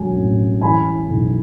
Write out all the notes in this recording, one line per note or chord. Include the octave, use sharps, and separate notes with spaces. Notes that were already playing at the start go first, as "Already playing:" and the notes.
Already playing: E1 F#3 G#5
A1
E3 G#5 B5
B1